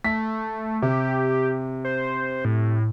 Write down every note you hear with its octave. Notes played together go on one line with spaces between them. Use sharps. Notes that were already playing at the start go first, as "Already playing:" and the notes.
A3 B6
C3 G4
C5
A2